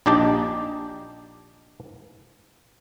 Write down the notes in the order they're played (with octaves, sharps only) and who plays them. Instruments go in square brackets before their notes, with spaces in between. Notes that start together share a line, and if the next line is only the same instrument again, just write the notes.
[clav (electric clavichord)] A#1 D4 D#4 G4 D5 A5